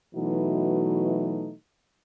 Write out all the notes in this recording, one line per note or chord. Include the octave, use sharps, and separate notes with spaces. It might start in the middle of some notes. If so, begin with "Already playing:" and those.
B2 E3 F#3 A3 D#4 F#4